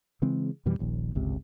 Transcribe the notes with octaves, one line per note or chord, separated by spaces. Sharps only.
C#3 E3 G#3 C4
F2 B2 E3 G3
D#1 A#1 D#2
G1 C#2 C3